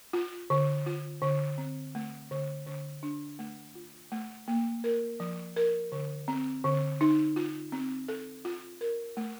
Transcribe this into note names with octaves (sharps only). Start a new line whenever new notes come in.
F4
D3
F4
D3
C4
A3
D3
D3
D4
A3
F4
A3
A#3
A#4
F3
A#4
D3
C4
D3
D#4
F4
C4
A4
F4
A#4
A3